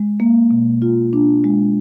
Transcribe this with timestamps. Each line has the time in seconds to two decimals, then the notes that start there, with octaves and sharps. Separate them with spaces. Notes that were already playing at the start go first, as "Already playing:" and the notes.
Already playing: G#3
0.20 A#3
0.51 B2
0.82 F4
1.13 D4
1.44 G#3